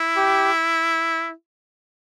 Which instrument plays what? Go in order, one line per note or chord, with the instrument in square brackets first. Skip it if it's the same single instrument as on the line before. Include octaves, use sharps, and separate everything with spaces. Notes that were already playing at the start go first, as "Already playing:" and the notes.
Already playing: [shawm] E4
[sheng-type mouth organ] G4